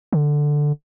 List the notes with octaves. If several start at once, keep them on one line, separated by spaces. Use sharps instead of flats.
D3